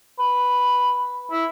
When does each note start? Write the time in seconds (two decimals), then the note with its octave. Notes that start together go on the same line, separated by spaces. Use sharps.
0.19 B4
1.31 E4